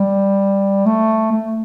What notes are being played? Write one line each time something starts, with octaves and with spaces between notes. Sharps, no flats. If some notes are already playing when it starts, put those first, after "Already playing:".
Already playing: G3
A3
A3